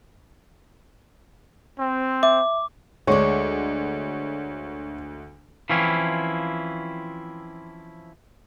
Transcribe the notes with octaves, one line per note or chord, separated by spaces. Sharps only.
C4
E5 D6
D2 G#3 D4 C#5 C#6
E3 F3 C4 C#4 E4 F4